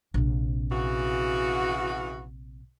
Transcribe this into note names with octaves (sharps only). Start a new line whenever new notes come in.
A#1 C3
C#3 E3 F#4